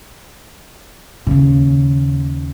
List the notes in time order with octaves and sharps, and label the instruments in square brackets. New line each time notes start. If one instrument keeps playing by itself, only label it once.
[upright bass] D#2 C#3